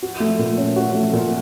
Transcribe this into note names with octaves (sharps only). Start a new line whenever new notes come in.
F#4
A3
A#2
C#4
F#4
A3
A#2